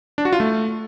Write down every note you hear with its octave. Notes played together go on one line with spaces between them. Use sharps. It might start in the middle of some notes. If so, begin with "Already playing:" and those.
D4
F#4
F4
A3